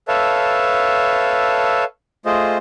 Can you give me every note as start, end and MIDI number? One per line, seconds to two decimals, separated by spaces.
0.08 1.84 69
0.08 1.84 71
0.08 1.84 73
0.08 1.84 76
0.08 1.84 77
0.08 1.84 81
2.26 2.57 57
2.26 2.57 65
2.26 2.57 68
2.26 2.57 72
2.26 2.57 75